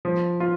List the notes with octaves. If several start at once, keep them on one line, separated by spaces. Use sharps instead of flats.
F3
F4